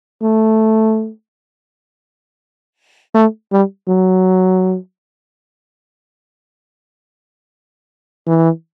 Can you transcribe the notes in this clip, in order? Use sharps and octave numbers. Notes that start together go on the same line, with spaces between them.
A3
A3
G3
F#3
E3